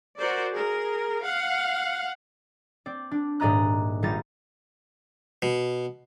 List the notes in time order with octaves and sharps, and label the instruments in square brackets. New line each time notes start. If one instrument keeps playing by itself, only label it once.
[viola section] F#4 A#4 C5 D5
G#4 A#4
F5 F#5
[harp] C4 D5
D4
D#1 G#2 D5 D#5 A#5 F#6
G#1 G3 D#4 F4 A6 A#6
[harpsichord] B2